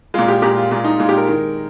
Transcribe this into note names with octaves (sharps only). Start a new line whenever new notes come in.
A#2 G#3 F4
G4
A#2 G#3 G4
F4
A#2 G#3 F4
D#4
A#2 G#3 F4
G4
A#4
D#3 G#3